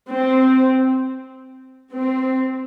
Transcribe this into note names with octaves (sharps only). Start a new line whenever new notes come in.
C4
C4